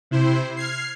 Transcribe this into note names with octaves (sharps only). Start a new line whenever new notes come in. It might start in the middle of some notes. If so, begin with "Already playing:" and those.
C3 E4 C5
F6 G#6 C7